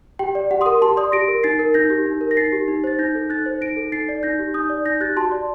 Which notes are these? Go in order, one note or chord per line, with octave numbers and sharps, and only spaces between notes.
G4 G5
D5
G4 F#5
C6 D#6
A#4
G4 A5 C6
D5 C6 D#6
G4 A#6 D7
A#4
D#4 A6 C7
A#4
D#4 G6 A#6
G4
D#4
A#4
A#6
D#4 A6 C7
G4
D#4
C5 A6
D#4 G6 A#6
A4
D#4 F#6 A6
C5
D#4 A#6 D7
A4
D#4 A6 C7
D5
D#4 G6 A#6
G4
D#4 D#6 G6
D5
D#4 G6 A#6
G4 F#6 A6
F#4 A5 C6
D5